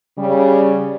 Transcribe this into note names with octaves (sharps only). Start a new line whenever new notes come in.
C#3 G3